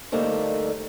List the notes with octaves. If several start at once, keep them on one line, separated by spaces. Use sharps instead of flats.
D2 G3 A3 A#3 D#4 C5